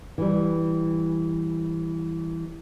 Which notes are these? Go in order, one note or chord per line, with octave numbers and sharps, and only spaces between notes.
E3 G3